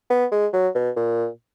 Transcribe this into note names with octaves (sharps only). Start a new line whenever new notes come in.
B3
G#3
F#3
B2
A#2